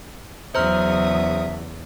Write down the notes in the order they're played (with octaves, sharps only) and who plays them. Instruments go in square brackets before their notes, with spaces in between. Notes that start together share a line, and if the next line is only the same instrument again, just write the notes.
[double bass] E2 [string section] C#3 F#3 D#6 [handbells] C5 A#5 F6 [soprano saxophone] E5